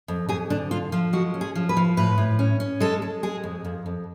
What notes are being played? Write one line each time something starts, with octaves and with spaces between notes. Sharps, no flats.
F2
F2 G#4
D3 D4
D3 F4
F3 F4
G#3 F#4
C#4
G#4
F3
B4
F3
A2 B4
A2
C#4
C#4
G#3 A4
G#3
G#3 G#4
F2
F2
F2